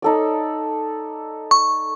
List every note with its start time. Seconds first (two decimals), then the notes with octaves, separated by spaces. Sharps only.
0.02 D#4 A4 D5
1.51 C#6